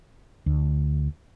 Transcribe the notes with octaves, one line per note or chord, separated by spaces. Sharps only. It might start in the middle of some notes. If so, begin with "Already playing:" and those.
D2